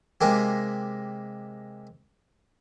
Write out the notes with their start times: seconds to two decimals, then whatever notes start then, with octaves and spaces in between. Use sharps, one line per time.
0.21 C3 G#3 A#3 G4